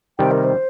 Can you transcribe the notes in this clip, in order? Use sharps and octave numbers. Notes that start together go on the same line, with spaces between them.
C3 D#3 G3 G5
A#4
C5